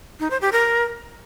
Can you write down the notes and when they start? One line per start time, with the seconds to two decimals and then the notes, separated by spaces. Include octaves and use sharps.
0.20 D#4
0.31 C5
0.41 G4
0.52 A#4